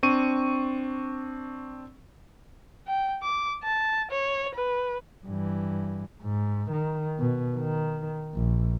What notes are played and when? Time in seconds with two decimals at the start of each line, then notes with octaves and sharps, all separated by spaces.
0.03 C4 D4 C#6 D#7
2.87 G5
3.23 D6
3.64 A5
4.11 C#5
4.55 B4
5.26 G2 E3
6.22 G#2
6.71 D#3
7.19 B2
7.56 D#3
8.34 A#1